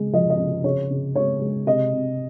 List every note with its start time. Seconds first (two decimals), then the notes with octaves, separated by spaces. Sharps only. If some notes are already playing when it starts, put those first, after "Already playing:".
Already playing: C#3 G#3
0.13 F3 D#5
0.30 D#5
0.39 C#3
0.64 C#3 C#5
0.90 C#3
1.15 G#3 C#5
1.41 G#3
1.66 C3 D#5
1.93 C3